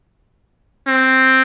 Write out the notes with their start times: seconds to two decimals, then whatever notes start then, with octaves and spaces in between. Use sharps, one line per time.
0.87 C4